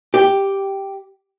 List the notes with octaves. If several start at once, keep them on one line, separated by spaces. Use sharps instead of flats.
G4